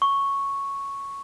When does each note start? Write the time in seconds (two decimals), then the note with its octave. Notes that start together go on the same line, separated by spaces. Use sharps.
0.02 C#6